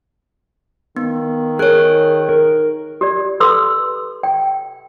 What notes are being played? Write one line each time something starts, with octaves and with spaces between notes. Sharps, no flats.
D#3 B3
G#4 A#4 C#5 F#6
A#4
G4 D5
A4 B4 C6 E6
G5